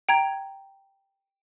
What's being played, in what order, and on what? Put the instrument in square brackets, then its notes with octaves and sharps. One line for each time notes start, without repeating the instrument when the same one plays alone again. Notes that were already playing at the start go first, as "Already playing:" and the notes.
[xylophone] G5 A#5 G#6